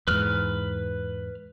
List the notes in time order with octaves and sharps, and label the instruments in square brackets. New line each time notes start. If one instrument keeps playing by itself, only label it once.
[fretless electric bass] E2 G#2 [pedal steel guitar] B4 F6